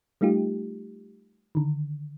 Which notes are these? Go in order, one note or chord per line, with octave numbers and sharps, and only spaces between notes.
G3 A3 D#4 F4 G4
D3 D#3